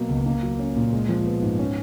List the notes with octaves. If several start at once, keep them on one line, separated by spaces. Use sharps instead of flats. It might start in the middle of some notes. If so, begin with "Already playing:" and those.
Already playing: B2 F#3 A#3
C#2
A#3
F#3
C#4
A#2
G#3
F3
B3
G#2
C#4